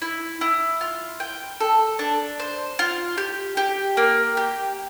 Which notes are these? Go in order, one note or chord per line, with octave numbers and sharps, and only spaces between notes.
E4
E4
F4
G5
A4
D4
C5
F4
G4
G4
A#3
G4